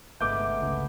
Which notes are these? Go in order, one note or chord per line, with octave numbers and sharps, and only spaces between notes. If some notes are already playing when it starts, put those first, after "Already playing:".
G1 C3 G#3 A3 B3 D6 G6
C#2